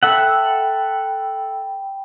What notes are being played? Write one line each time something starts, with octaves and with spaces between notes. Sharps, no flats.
A4 E5 F#5 G5 B5